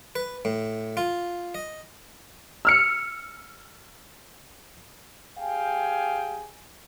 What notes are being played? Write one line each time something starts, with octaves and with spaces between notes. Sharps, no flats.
B4
A2
F4
D#5
E6 F6 C#7
G4 G#4 F5 G5 G#5